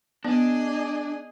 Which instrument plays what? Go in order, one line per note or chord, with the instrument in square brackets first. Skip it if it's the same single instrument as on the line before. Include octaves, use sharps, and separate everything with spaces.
[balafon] B3 [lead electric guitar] D4 [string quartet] G#4 D#5